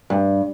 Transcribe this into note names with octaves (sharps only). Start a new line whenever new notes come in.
G2